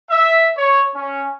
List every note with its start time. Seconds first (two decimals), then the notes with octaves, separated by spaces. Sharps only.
0.10 E5
0.57 C#5
0.95 C#4